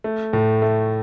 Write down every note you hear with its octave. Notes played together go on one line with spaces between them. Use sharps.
A3
A2
A3